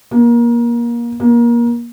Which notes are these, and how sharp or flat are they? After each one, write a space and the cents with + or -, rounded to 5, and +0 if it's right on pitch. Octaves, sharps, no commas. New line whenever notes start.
A#3 +25
A#3 +25